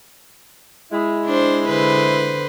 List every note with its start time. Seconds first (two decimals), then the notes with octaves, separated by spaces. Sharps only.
0.91 G#3 E4
1.26 D4 C5
1.68 D3 B4 C5